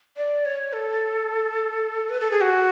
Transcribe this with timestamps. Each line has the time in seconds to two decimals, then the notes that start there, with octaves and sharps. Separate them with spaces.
0.17 D5
0.45 C#5
0.73 A4
2.09 B4
2.20 A4
2.31 G#4
2.41 F#4